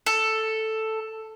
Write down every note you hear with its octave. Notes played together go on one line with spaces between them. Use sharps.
A4